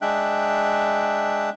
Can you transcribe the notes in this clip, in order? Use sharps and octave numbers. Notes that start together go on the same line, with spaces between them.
G#3 D4 E5 G5 F#6